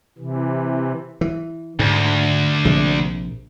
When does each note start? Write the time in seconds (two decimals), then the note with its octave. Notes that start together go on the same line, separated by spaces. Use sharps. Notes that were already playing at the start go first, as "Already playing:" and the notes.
0.18 C3 E3
1.21 E3
1.79 D2 G#2
2.65 A#1 C3